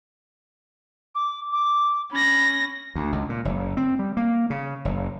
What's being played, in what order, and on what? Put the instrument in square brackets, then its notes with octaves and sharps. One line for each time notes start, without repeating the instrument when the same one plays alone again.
[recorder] D6
D6
[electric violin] C#4 A#6 [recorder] B5
[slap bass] D2
C#2
A#2
F#1
C4
G3
A#3
C#3
F#1